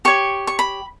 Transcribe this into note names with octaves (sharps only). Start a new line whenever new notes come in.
G4 C#5 C#6
C#6
B5